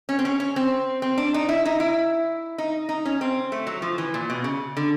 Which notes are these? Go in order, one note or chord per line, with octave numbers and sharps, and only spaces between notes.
C#4
C4
C#4
C#4
C4
C4
D4
D#4
E4
D#4
E4
D#4
D#4
C#4
C4
A3
F#3
F3
E3
A#2
B2
C#3
D3